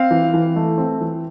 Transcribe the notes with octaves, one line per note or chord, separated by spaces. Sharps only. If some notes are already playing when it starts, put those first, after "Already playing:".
Already playing: C4 F5
E3
E3
A3
C4
E3